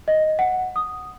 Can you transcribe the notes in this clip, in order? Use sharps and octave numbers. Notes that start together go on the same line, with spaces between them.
D#5
F#5
D#6